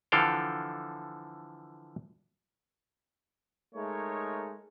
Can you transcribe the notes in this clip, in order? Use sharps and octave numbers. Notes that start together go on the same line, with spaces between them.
D3 E3 F3 A4 F5 G5
G#3 A3 D#4 A#4 C#5